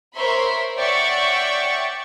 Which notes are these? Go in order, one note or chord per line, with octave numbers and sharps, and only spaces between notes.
A#4 C5 C#5 E5 B5 C6
C#5 D5 E5 F#5 G5 C#6